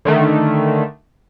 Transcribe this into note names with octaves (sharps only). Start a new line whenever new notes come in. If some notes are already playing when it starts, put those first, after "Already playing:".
D3 D#3 A3